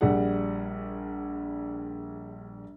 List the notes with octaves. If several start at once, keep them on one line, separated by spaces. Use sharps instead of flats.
A#1 G3 G#4 F#5